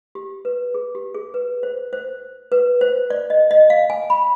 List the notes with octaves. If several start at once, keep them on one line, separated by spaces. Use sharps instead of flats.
G4
B4
G#4
G4
G#4
B4
C5
C5
B4
C5
D5
D#5
D#5
F5
G#5
B5